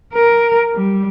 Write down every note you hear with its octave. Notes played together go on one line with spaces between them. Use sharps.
A#4
G3